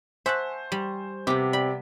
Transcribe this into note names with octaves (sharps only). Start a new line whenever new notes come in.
C5 E5 F#5 G#5 A5 C#6
G3
C3 B3 G4
D5 G5 B5